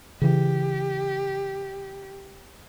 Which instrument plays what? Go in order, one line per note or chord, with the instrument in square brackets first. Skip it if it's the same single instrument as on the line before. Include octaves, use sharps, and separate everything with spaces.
[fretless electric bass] C#3 E3 [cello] G4